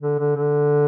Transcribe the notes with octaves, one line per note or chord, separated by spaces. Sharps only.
D3
D3
D3